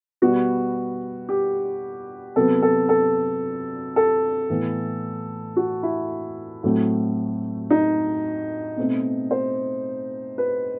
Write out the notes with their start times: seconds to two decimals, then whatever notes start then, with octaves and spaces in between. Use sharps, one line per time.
0.22 B2 G3 B3 F#4
1.29 G4
2.36 C3 F#3 B3 A4
2.62 A4
2.89 A4
3.96 A4
4.50 A2 E3 B3
5.56 F#4
5.83 E4
6.63 A2 F#3 A3 C4
7.70 D#4
8.77 B2 A3 C4
9.31 C5
10.38 B4